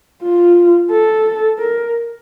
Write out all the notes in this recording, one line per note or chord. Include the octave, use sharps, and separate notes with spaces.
F4
A4
A#4